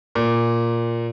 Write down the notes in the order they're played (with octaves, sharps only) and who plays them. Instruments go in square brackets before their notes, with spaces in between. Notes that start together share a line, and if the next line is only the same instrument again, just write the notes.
[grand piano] A#2